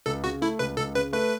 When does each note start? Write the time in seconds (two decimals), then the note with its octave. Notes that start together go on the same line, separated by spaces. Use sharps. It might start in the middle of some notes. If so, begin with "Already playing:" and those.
0.06 C#2 A4
0.23 C#3 F#4
0.41 A3 E4
0.59 C#2 B4
0.77 C#2 A4
0.95 C#3 B4
1.13 A3 B4